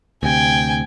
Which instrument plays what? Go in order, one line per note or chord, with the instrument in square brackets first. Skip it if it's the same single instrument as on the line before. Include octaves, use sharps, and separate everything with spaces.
[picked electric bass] D2 C3 [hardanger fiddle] G5 G#5